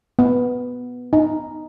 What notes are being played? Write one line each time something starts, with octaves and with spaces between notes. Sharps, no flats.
B3
D#4